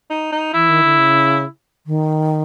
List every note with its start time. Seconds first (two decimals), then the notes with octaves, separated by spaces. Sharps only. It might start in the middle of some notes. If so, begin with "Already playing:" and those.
0.10 D#4
0.32 D#4
0.54 E3 E4
0.69 D#3
0.84 D3
0.98 C#3
1.87 D#3